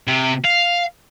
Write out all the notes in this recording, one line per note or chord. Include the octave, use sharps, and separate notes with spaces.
C3
F5